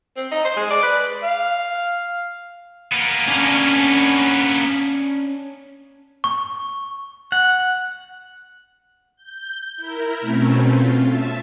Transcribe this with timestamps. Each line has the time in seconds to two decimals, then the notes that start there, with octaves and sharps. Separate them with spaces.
0.17 C4
0.32 D#4
0.45 C5
0.56 G#3
0.70 D5
0.82 B4
1.23 F5
2.92 A#3 B3
3.28 C#4 D4
6.24 C#6
7.32 F#5
9.16 G6
9.77 E4 A#4
10.21 B2 A3 C4 C#4
10.66 F4
11.05 E5 A5